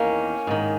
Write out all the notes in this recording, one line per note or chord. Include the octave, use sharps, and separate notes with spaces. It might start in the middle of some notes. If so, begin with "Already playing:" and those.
Already playing: E2 D#3 A#3 C#4
G#2 D#3